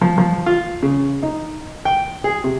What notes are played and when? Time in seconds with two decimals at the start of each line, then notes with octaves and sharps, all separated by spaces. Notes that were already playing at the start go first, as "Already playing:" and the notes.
0.01 F3
0.18 F3
0.46 F4
0.83 C#3
1.23 D#4
1.85 G5
2.24 G#4
2.44 C3